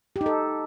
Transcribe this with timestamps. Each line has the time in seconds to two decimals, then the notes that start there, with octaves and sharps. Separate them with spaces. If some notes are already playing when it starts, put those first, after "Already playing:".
0.16 G4
0.21 D#4
0.26 A4